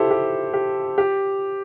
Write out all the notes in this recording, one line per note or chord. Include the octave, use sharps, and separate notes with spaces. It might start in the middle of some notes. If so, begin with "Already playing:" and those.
Already playing: E4 G4 A4 C5
G4
G4
G4